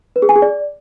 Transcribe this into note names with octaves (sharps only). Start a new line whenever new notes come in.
B4
G#4
G#5
G#4
D5